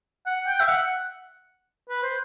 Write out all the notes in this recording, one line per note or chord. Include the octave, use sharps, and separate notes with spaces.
F#5
G5
E5
F#5
B4
C5